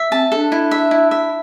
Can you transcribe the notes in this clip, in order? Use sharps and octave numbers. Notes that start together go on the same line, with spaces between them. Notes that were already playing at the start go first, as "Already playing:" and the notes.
Already playing: E5
C4 A5
D4 A4
E4
E5
E4
E5